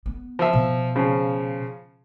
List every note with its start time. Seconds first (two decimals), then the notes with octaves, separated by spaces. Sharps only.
0.06 B3
0.39 F3 E5
0.53 B2
0.96 C#3 F3